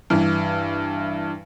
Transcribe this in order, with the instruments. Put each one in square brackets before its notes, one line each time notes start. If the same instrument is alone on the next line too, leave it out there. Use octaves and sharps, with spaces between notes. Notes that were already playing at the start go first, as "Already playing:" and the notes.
[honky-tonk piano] G2 E3